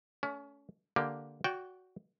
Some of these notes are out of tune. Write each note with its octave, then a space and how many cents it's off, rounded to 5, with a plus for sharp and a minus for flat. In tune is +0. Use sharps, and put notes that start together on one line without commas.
A3 +0 C#4 +30
D3 +0 A#3 +0 G4 +0
F#4 +0 D5 -40 G5 -10